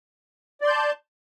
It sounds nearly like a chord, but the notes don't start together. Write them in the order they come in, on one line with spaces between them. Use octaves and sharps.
D5 C6 G6 A5